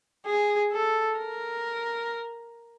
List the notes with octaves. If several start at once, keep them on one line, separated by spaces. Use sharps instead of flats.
G#4
A4
A#4